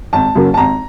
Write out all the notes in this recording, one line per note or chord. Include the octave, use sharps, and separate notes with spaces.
G#1 A5
F#2 C#3 F#3 A#3
A5
G#1 A#5